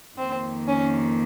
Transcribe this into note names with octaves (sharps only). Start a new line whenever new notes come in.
F2 D#3 A#3 C4
C#4